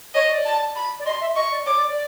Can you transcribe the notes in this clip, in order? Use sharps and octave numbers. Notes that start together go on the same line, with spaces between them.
C#5 D#5
D5
A5
B5
D5
D#5 C6
E5
D#5 C#6
D5
C#5 D6
D5
D5